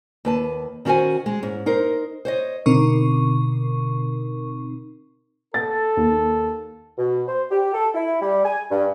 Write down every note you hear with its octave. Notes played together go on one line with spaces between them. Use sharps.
D#2 B4 A5
D#3 C#4 F#4 C5 G#5
G#3
G#2 C#4
D#4 A#4 C5
C5 C#5 D#5
B2 D3 C4 D#4 A#4 C#6
A4 A6
D#2
B2
C5
G4
A4
E4
G3
G#5
G2